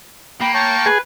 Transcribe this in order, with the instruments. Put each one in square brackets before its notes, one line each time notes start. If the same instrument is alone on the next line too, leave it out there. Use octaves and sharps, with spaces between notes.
[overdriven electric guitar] A#3 [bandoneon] G5 B5
[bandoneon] C#5 [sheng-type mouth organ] G5 A5 C#6
[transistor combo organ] G#4 [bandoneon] B4